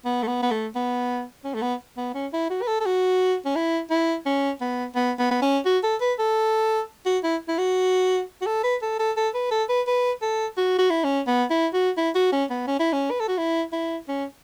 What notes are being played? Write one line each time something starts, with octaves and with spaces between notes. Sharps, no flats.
B3
A3
B3
B3
A3
B3
C#4
A3
B3
B3
C#4
E4
F#4
B4
A4
A4
F#4
C#4
E4
E4
C#4
B3
B3
B3
B3
C#4
F#4
A4
B4
A4
F#4
E4
E4
F#4
F#4
A4
B4
A4
A4
A4
B4
A4
B4
B4
A4
F#4
F#4
E4
C#4
B3
E4
F#4
E4
F#4
C#4
B3
C#4
E4
C#4
B4
A4
F#4
E4
E4
C#4